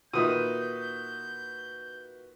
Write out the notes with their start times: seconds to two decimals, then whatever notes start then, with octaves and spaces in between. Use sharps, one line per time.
0.13 A#2 D#3 D#4 F#4 B4 E5 D#6 G6